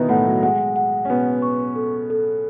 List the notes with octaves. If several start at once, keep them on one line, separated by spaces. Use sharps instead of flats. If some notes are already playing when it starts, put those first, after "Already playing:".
Already playing: B2 D#3 E3 B3 D#4 E4 B4
A2 A3 F#5
F#3
G#3 F#5
F#5
C#4
B2 B3 B4
C#6
A4
A4